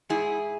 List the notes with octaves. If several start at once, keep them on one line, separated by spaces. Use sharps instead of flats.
G#2 E4 G#4